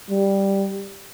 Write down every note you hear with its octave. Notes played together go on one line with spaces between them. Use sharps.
G3